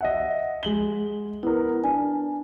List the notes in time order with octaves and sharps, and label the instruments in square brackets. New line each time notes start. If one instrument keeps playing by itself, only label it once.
[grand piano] D#5 E5 F#5
G#3 F#7 G7
[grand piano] B3 A#4 [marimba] E4
[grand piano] D4 [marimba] G#5